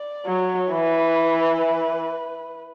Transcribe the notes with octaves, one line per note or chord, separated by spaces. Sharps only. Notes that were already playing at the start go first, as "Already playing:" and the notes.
Already playing: D5
F#3 C#5
E3 B4